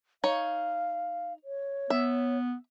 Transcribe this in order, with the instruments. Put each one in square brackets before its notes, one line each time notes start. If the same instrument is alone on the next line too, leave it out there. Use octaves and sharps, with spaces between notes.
[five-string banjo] D#4 C#5 [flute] F5
[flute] C#5
[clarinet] B3 [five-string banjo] E5